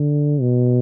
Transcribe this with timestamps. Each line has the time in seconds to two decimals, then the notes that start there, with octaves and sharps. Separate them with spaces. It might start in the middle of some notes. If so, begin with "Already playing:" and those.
Already playing: D3
0.41 B2